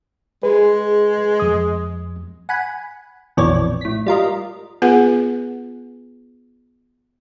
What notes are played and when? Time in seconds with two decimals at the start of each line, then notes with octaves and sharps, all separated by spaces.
0.43 G#3 G#4 B4
1.40 F2 D#6
2.49 F#5 G#5 B5
3.37 A#1 F2 B2 E3 C#5 D5
3.81 A2 B6
4.06 G3 F4 A#4 D#5
4.82 B3 F4 G#4 B4 F#5